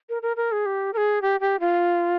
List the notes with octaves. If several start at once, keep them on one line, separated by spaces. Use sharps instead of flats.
A#4
A#4
A#4
G#4
G4
A#4
G#4
G4
G4
F4